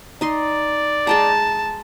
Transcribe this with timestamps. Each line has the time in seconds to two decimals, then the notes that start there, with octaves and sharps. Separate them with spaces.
0.21 D#4 D5 D#5 C6
1.07 G#3 G5 A5 A#5